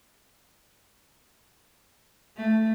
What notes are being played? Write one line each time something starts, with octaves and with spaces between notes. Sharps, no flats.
A3